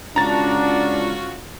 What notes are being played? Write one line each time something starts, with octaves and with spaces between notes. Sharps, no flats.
C#2 C#4 D4 F4 F#4 A#5 A6